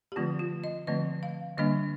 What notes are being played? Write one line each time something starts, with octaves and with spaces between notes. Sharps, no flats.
G4
D3 F3 A3 C4 F4
F4
D#5
D3 F3 A3 C4 D#5
F5
D3 G3 A#3 D4 D#5